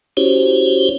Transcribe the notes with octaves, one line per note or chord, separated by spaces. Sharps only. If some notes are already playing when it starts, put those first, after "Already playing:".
C#4 E4 F#4 G4 C5 C#5